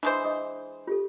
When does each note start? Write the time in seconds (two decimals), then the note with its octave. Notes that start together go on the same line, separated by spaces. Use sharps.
0.03 E3 G#3 D4 C5
0.24 D#5 D6 D#6
0.87 F4 G4 A4